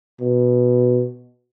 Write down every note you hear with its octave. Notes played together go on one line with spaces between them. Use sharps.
B2